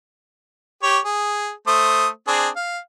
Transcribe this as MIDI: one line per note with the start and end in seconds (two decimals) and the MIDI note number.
0.83 0.98 67
0.83 0.98 73
1.05 1.51 68
1.67 2.08 57
1.67 2.08 72
1.67 2.08 87
2.28 2.48 60
2.28 2.48 62
2.28 2.48 68
2.56 2.78 77